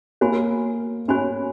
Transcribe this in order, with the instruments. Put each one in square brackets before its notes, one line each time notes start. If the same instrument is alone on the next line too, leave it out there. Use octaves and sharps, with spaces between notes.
[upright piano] A#3 [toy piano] F#4 C#5 G#5 B5
[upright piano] C#4 [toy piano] F#4 C#5 G#5 B5